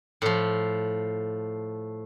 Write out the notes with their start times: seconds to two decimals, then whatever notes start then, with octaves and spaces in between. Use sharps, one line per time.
0.22 A2 F3